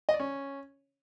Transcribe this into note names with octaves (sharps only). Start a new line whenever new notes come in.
D#5
D5
C#4